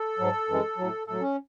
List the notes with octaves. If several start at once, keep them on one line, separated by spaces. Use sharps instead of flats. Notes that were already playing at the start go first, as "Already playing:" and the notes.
Already playing: A4
G#2 F#3
F#2 E3 G#3
A2 F#3
A2 F#3 A4
C#4